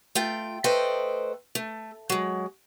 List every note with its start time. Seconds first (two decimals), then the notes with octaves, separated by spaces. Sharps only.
0.15 A3 F4 G5
0.64 A3 A4 B4 C5 D#5 G5
1.55 A3
2.10 F#3 G#3